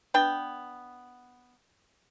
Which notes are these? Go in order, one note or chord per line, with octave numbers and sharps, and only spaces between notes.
B3 D4 G5